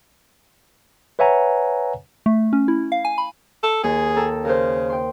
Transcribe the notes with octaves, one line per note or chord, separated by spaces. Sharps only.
B4 C#5 E5 F#5 G#5 A#5
A3
C#4
E4
F5
G#5
B5
A4
D#2 G#4
A4 G5 A#5
C#3 A#4 C5
G5 C6